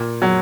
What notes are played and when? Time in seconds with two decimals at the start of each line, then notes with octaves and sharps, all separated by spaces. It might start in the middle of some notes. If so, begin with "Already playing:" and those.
Already playing: A#2
0.22 F#3